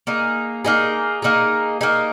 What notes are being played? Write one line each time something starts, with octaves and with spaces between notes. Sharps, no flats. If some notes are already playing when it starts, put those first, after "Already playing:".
A#3 D#4 G#4
A#3 D#4 G#4
A#3 D#4 G#4
A#3 D#4 G#4